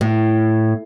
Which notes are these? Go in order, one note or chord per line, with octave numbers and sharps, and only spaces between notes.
A2